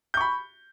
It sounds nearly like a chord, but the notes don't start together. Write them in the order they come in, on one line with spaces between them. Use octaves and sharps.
G6 C#6 B5